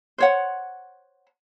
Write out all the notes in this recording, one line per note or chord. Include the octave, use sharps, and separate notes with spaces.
C5 C#5 F#5